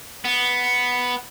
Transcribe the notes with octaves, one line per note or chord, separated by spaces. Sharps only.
B3